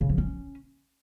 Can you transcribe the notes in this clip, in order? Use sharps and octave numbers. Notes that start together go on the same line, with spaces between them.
C#3
F3
C#4